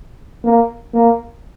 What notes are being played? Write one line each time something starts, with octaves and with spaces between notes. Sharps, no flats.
A#3
A#3